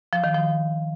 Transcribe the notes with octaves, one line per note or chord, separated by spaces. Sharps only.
F3
D#3
F3